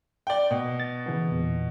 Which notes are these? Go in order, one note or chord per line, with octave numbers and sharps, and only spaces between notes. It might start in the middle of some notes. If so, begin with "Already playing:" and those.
D5 G5
B2
A6
C#3 E3 B3
E2 A#2